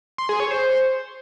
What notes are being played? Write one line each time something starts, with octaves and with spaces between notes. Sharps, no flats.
C6
G#4
C#5
C5